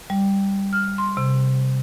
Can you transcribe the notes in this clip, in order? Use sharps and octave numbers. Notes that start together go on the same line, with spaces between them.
G3
F6
C6
C3